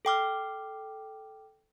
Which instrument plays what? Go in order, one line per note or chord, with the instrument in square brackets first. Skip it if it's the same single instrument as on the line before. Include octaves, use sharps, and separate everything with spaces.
[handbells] A4 G5 D6 F6